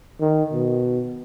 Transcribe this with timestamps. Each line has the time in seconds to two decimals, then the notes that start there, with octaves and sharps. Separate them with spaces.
0.20 D#3
0.53 B2